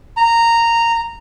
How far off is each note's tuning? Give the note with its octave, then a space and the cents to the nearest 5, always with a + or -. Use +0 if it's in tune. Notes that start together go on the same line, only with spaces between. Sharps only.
A#5 -10